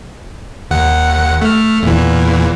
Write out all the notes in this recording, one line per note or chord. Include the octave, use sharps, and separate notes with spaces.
D#2 F#5
A3 F6
E2 A#2 E3